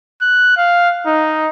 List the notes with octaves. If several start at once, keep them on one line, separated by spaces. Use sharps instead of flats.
F#6
F5
D#4